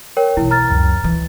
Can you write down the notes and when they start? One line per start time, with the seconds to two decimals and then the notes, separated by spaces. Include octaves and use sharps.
0.17 A#4 C#5 G5
0.37 B1 E3 E4
0.51 A#5 F6 A6
0.70 C#2 F#2
1.04 E3